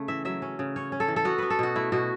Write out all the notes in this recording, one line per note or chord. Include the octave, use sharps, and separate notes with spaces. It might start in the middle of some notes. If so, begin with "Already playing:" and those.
Already playing: C#3 A3
E3 E5
F#3 E5
C#4
C#3
C#4 C#5
C#4
A4
E3
A4
B3 F#4
B3 B4
A4
B2 F#4
A3 E4
B2 F#4